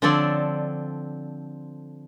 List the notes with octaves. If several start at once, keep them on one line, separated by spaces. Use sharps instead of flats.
D3 F3 C4 A4 C#5 D5